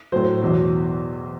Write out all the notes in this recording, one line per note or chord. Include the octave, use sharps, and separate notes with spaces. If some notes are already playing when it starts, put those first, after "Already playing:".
A2 F#3 C5
E2 B2 F#3